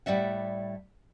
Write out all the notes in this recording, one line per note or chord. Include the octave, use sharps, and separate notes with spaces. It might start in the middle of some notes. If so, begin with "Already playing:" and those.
A2 G3 D5 E5 F#5